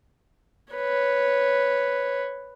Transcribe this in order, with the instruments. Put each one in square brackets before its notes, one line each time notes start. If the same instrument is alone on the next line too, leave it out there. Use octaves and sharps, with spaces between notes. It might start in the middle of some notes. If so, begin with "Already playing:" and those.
[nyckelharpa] B4 C#5